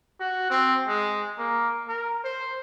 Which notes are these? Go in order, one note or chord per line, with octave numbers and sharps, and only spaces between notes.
F#4
C4
G#3
A#3
A#4
C5